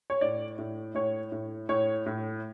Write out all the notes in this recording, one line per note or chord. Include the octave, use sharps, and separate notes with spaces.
C#5
A2 D5
A2
A2 C#5
A2
A2 C#5
A2